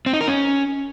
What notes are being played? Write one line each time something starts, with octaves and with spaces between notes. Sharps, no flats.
C4
D#4
A#4
C#4